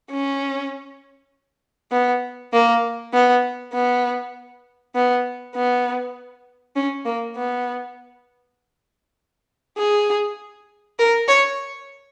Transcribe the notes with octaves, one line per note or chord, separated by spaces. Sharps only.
C#4
B3
A#3
B3
B3
B3
B3
C#4
A#3
B3
G#4
A#4
C#5